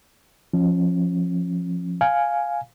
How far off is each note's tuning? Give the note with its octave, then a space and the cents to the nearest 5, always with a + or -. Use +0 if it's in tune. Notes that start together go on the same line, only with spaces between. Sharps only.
F3 +0 C#4 -30
F5 +0 G#5 +5